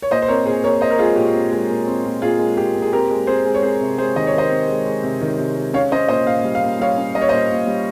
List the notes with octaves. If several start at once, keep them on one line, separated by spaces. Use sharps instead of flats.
C#5
A#2 C5 D#5
C5
C4 A#4 C#5
A#2 G#4 C5
A#2 A#4 C#5
A#2 C5 D#5
A#4
G#3 F4 G#4
A#2 G4
C4
G#3
A#2
C4
A#2
A#2 F4 G#4
G#3
A#2 G4
A#2
G#4
C4 G4 A#4
G#3
C4 G#4 C5
G#3
C#5
C4 G#4 C5
C3
G#3 G#4 C5
D#3 D#5
C#5
D#3 C5 D#5
C4
G#3
G#3
C3
D#3
C3
G#3
C#4 C#5 F5
C#4 C5 D#5
A#2 C5 D#5
A#2 F5
G3
F5
A#2
G3 C#5 F5
C#4
G3 D#5
C#5
A#2 C5 D#5
A#2
G3